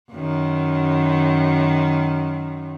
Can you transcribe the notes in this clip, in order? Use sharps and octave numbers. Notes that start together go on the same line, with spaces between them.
F#2 D#3